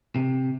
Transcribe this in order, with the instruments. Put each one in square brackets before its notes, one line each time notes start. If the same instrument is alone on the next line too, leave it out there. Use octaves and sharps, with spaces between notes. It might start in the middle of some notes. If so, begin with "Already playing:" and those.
[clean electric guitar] C3